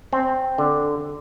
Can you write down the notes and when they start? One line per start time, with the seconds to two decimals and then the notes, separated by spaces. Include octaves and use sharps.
0.13 C4
0.58 D3